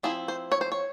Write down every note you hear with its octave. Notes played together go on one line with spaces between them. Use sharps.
F3 C4 E4 G#4
C5
C#5
C5
C#5